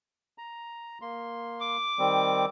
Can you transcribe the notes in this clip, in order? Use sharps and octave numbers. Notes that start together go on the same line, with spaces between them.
A#5
A#3 C6
D6
D#3 G3 C4